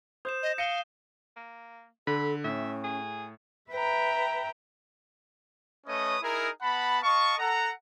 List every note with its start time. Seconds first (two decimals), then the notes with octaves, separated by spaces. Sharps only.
0.25 C5 D#6 G6 E7
0.43 D#5
0.58 F5 A#6 C#7 D#7 G7
1.36 A#3
2.07 D3 A4 B5
2.44 A2 C#4 E5
2.84 G#4
3.71 B4 E5 G5 A#5
5.87 A3 C#4 B4 C#5 D#5 D#6
6.22 D#4 E4 G#4 A#4
6.62 B3 F#5 A5 B5
7.03 D#5 F5 A5 C#6
7.39 A4 F#5 A#5